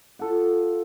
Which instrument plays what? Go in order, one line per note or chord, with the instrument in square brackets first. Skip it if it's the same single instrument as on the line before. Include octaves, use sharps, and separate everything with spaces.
[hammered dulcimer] F4 A4 F#5